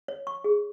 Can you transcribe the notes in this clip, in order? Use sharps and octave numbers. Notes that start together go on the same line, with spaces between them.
C#5
C#6
G#4